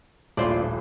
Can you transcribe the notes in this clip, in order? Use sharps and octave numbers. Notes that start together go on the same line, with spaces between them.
D#1 A#1 A2 F4 C5 D5